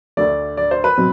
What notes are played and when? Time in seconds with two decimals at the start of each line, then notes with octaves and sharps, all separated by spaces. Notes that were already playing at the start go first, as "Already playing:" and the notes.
0.17 D2 D3 A3 D5
0.57 D5
0.71 C5
0.84 B4
0.97 B2 F#3 C4